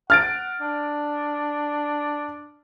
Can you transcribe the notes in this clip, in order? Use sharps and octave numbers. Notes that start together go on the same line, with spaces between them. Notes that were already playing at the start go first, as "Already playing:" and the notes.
F#5 F6 A6 D7
D4